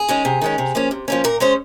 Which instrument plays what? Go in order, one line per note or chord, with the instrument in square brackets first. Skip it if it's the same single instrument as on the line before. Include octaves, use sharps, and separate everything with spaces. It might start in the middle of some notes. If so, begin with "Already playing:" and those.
Already playing: [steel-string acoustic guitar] G#4
D#3 G#3 C#4
C3
D#3 G#3 C#4
C3
F3 A#3 C#4
C3
F3 A#3 C#4
A#2 A#4
G#3 C#4 C5